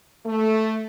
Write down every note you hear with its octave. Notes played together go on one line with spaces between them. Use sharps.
A3